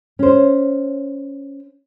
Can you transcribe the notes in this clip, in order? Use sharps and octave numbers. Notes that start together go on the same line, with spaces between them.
C#4 C5